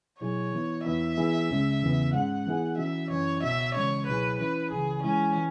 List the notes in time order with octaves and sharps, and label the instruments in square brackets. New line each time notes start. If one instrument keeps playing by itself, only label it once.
[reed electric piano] B2 F#3 E4 G#4 [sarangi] C#5
[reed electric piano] E3 B3 E4
[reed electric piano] E2 E3 B3 E4 [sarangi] E5
[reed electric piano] E3 B3 E4 G#4
C#2 C#3 G#3 C#4
E2 C#3 E3 B3
[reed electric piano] G#2 G#3 C#4 [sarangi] F#5
[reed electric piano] E3 B3 E4 G#4
[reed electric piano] E3 C#4 F#4 [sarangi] E5
[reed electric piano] F#2 E3 C#4 E4 [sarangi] C#5
[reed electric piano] C#2 B2 B3 F#4 [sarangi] E5
[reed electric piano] C#3 E3 G#3 C#4 [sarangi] C#5
[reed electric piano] C#2 B2 F#3 E4 G#4 [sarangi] B4
[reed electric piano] E3 C#4 E4 [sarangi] B4
[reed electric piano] C#2 C#3 E3 [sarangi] G#4
[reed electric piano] E3 G#3 E4 [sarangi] C#4
[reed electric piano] E3